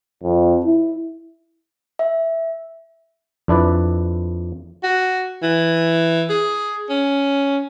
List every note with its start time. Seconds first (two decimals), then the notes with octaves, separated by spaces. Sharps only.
0.23 F2
0.65 E4
1.99 E5
3.48 F2 D4 E4 B4 D5
4.83 F#4
5.43 E3
6.30 G#4
6.89 C#4